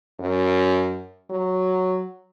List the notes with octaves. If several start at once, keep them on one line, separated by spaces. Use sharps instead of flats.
F#2
F#3